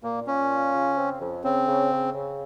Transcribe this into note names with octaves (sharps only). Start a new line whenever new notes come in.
A#2 A#3
A#2 C#4
F4
C#3
C4
F2
C#3 C4
C#3
C#3
C#3